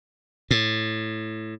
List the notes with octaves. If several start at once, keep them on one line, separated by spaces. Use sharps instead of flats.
A2